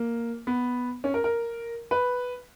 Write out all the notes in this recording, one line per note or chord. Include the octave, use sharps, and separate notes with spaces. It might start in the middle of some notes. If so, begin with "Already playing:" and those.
Already playing: A#3
B3
C#4
A#4
A#4
B4